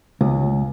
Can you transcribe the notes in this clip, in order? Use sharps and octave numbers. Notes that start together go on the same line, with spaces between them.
C#2